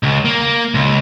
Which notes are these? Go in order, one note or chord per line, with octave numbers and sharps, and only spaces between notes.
C#2
A#3
C#2